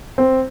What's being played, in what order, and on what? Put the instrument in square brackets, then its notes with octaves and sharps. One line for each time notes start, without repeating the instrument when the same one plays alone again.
[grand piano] C4